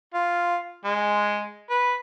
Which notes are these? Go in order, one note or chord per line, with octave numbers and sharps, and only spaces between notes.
F4
G#3
B4